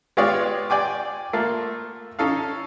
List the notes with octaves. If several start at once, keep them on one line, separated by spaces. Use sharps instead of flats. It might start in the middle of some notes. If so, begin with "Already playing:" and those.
G#3 B3 F4 G4 C#5 D5
D5 G5 G#5 D6
A3 A#3 F4
C#4 D#4 A4 F5